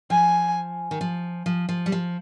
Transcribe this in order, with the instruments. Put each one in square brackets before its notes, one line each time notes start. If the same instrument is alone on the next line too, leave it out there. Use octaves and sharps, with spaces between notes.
[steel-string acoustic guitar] F3 [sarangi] G#5
[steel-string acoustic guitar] D#3
F3
F3
F3
G3
F3